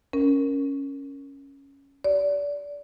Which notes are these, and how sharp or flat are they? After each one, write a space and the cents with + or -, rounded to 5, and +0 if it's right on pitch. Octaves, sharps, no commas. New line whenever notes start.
C#4 +0 A#4 +0
G4 -30 D5 -25